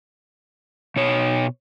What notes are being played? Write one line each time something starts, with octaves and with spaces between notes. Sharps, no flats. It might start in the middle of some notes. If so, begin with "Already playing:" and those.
B2 C#5